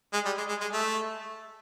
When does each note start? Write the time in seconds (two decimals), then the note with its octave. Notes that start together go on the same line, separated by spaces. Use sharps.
0.13 G#3
0.25 G3
0.38 G#3
0.49 G#3
0.61 G#3
0.73 A3